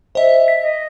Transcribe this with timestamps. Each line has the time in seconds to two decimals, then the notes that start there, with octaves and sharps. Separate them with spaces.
0.15 C5 D#5 E5
0.48 B6
0.62 D#5